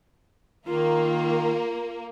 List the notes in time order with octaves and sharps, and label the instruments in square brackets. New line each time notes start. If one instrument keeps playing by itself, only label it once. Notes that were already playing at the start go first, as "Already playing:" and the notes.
[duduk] D#3 [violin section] A#3 [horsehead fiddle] F4